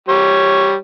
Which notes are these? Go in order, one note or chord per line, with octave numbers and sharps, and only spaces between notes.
G3 C#5